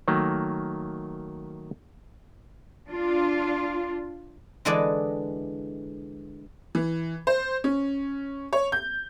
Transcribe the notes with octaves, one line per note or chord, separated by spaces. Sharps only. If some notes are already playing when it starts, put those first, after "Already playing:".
D#3 F#3 A3 A#3
D4 F4
D3 E3 G#3 A4 D5 D#5
E3
C5
C#4
C#5
G6